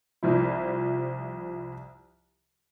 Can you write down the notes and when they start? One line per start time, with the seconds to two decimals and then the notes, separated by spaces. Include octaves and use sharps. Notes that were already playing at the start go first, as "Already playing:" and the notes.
0.23 C2 F3 E4